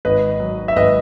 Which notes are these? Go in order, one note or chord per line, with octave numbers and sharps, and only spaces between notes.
G#1 B4 D#5
F#3
E5
G#1 B4 D#5